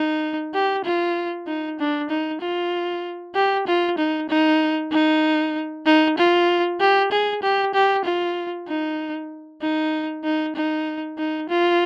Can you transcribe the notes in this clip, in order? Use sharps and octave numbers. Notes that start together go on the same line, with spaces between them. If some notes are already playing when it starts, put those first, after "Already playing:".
Already playing: D#4
G4
F4
D#4
D4
D#4
F4
G4
F4
D#4
D#4
D#4
D#4
F4
G4
G#4
G4
G4
F4
D#4
D#4
D#4
D#4
D#4
F4